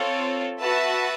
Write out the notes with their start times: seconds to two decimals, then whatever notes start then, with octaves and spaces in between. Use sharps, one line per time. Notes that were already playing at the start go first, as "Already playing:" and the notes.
Already playing: C4 F4 A4 C#5
0.60 F#4 B4 E5 A5